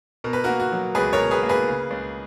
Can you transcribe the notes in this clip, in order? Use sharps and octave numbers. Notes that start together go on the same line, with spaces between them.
B2 A#4
B4
A#3 F#4 A#4
F#4
F#3
C#2 G#4 B4
A#4 C#5
B2
G#4 B4
A#3
G#4 B4
C#3
C#2